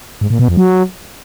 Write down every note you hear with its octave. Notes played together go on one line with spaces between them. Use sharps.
G#2
A#2
B2
F2
F#3